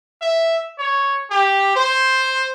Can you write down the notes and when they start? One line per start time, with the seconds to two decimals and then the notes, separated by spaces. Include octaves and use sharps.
0.21 E5
0.79 C#5
1.31 G4
1.76 C5